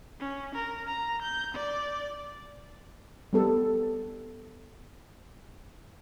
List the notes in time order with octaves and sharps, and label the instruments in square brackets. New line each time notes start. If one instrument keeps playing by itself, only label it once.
[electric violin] C#4
A#4
A#5
G6
D5
[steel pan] G3 B3 A4